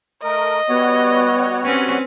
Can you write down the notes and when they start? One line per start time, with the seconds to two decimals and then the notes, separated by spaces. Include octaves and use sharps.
0.24 A3 A#4 D#5
0.69 G3 B3 F#4 C#5
1.64 C4 C#4 B4